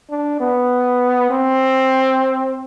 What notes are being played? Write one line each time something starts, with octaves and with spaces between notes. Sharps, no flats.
D4
B3
C4